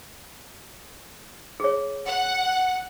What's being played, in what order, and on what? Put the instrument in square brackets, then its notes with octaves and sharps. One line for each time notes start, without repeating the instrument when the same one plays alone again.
[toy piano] G#4 C#5
[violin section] F#5